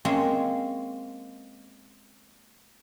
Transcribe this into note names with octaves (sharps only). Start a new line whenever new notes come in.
G#3 A#3 C4 C#4 G#4